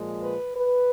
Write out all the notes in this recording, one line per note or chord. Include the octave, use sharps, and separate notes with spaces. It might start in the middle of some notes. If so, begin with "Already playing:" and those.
Already playing: A#2 F3 G#3
B4
B4